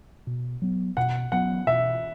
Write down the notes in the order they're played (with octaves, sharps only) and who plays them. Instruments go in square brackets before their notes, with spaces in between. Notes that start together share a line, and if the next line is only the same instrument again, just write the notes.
[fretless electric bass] B2
F#3 B3
[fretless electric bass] B2 [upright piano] F#5
[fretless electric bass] F#3 B3 [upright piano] F#5
[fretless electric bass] B2 [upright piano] E5